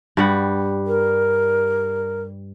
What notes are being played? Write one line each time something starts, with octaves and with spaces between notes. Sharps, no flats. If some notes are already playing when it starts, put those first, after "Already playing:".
G2 G3 F#5
A#4